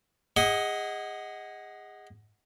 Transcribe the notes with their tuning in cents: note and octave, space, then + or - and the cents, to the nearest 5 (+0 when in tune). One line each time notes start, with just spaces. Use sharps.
G#4 -25 D#5 +15 F#5 +5